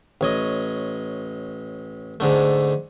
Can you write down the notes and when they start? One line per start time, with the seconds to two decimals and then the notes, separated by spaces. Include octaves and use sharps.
0.21 A1 C#5 D#5
2.20 G#2 D3 A3